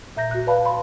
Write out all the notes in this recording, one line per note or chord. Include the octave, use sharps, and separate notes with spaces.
A#2 E5 A#5 G6 A#6
F#4 F#6
B4 D5 F5 A5 B5
F5 B5 C6